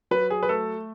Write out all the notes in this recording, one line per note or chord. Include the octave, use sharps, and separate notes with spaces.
F#3 B4
G#4
B4
A3 A4